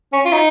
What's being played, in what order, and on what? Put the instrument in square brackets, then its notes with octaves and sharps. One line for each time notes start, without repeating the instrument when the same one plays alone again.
[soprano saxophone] C#4
F4
D#4